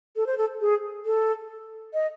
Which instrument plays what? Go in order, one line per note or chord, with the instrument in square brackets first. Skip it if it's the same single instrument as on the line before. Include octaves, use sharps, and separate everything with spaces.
[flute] A4
C5
A4
G#4
A4
D#5